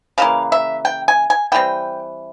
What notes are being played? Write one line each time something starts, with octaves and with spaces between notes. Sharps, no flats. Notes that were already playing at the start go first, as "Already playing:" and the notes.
C#3 E3 A#3 F5
E5
G5
G#5
G#5
E3 G3 C4 G5